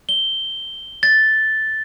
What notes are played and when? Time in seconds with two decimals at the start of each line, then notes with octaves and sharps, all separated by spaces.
0.09 G7
1.03 A6